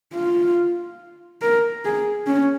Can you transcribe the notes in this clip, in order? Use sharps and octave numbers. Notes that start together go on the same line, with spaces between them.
F4
A#4
G#4
C#4